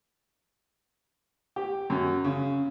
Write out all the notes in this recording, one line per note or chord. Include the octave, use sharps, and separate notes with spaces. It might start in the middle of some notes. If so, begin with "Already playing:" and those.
G4
F#2
C#3